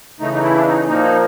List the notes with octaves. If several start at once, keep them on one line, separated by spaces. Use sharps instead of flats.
C#3 E3 A3 D#4
D#4
E4
D4
D#4
A#2 F3 A#3 D#4